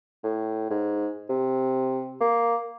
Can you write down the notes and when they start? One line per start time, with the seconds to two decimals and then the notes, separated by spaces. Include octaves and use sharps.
0.24 A2
0.70 G#2
1.29 C3
2.20 A#3